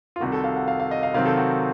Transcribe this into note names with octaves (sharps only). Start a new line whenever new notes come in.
F4
C2 C3 D#3 F#4
A4
F5
F#5
F5
F5
D#5
F5
C3 D#3 F#3 C4 F5
A4
F#4